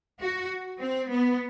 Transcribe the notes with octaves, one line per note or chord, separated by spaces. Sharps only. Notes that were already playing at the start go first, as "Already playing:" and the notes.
F#4
C4
B3